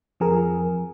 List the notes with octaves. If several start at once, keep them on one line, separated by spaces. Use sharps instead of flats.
F2 F3 G#4 A#4